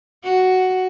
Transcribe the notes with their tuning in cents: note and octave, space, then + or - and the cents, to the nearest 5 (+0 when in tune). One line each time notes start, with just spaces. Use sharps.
F#4 +5